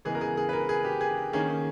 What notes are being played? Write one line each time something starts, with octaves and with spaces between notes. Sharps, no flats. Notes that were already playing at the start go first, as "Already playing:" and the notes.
C#3 E3 G#3 B3 G#4
A#4
G#4
G#4
B4
A#4
G#4
G4
G#4
D#3 A#3 C#4 G#4